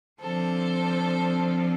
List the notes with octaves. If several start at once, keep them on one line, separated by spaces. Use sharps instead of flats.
D3 F3 C4 A4 C5